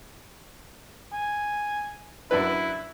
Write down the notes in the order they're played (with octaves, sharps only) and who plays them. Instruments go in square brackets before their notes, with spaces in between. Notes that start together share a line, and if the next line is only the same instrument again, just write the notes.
[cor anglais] G#5
[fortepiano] F#2 D4 B4 [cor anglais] E4